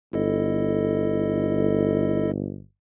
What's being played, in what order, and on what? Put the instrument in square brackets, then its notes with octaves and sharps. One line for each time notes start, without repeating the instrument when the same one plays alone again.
[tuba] G1 [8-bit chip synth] E4 A4 D#5